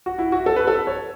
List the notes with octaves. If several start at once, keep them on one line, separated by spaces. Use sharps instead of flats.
F#4
E4
F#4
A4
B4
A4
C#5